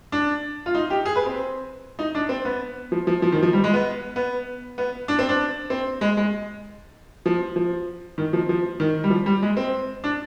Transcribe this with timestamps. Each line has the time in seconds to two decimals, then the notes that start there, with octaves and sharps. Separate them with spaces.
0.12 D4
0.66 F4
0.75 D#4
0.90 G4
1.05 G#4
1.16 B4
1.26 C4
1.99 D#4
2.15 D4
2.29 C4
2.45 B3
2.92 F3
3.07 F3
3.22 F3
3.32 D#3
3.43 F3
3.53 G3
3.64 G#3
3.74 B3
4.16 B3
4.78 B3
5.08 D4
5.19 C4
5.29 D4
5.70 C4
6.01 G#3
6.17 G#3
7.26 F3
7.56 F3
8.18 D#3
8.33 F3
8.49 F3
8.80 D#3
9.04 G3
9.10 F3
9.26 G3
9.42 G#3
9.57 C4
10.04 D4